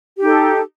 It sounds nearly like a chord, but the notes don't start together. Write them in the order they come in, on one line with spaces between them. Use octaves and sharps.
G4 D#4 A4